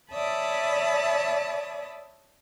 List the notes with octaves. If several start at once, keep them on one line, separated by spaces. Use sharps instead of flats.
C#5 D5 E5 A5 B5 D#6